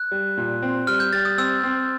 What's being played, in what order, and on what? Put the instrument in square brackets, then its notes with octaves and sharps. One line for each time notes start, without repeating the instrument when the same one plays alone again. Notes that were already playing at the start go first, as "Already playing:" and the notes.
Already playing: [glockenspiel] F#6
[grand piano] G3
A#2
C4
[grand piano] G3 [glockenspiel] F6
[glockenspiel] G6
[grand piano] G3 [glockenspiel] A6
[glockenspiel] D#6
[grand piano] C4 [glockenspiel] E6
[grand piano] C4